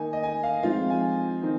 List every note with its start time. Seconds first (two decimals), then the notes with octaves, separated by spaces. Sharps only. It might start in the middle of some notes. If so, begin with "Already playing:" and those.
Already playing: D#3 A#3 D#4 G#5
0.13 D#5
0.23 G#5
0.43 F5
0.63 F3 G#3 C4 D#4 F4
0.90 G#5
1.43 D#3 C4 D#4